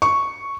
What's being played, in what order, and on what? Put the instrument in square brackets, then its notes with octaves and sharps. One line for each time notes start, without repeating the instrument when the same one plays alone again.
[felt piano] C#6